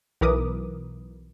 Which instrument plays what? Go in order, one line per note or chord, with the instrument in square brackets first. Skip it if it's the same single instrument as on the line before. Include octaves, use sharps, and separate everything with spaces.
[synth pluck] B1 E3 A#4 B4 D6 D#6